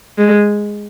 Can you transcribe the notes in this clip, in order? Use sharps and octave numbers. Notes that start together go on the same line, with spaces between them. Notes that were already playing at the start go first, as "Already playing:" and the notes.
G#3